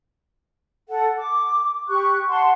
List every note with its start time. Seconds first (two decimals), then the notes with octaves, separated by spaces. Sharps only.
0.89 A4 F#5
1.16 D6
1.88 G4 C#6 F#6
2.28 F#5 A5 C6